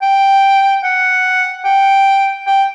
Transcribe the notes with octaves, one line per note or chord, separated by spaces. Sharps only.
G5
F#5
G5
G5